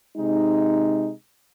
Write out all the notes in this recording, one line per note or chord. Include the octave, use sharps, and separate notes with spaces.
C3 G#3 D#4